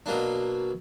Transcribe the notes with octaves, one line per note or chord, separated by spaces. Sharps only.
B2 F#3 A#3 D4